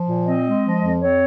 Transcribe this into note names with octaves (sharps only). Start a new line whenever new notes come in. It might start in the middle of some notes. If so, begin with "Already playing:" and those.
Already playing: F3
A#2
C4 D#5
G#3
F3
F2
C4 C#5